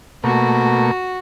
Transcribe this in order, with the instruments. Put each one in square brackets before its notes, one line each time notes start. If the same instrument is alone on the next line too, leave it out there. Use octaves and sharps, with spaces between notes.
[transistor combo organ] B2 A3 A#3 [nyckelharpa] F#4